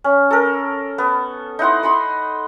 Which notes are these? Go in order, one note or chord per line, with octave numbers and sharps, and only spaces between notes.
C#4
A4 A#4
B3
D#4 E4 F#5 C6
D#5 B5 C6